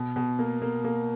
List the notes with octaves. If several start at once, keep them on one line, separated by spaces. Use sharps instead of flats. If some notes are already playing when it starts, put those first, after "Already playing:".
Already playing: B2
B2
A#3
A#3
A#3